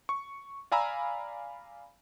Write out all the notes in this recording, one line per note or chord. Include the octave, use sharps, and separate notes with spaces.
C#6
D5 F5 G#5 A#5 B5 E6